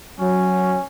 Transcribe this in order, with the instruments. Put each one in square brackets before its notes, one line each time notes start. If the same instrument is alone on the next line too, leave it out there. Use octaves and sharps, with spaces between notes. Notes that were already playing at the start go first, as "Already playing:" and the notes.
[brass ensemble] F#3 [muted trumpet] C#4